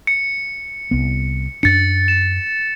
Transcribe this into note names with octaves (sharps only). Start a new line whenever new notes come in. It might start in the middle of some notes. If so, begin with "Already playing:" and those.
C#7
C2 B3
F#2 D4 A6 C#7
E7